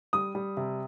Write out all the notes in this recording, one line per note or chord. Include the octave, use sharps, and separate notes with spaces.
G3 D#6
G3
C3